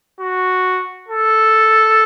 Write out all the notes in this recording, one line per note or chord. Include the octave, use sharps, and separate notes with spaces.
F#4
A4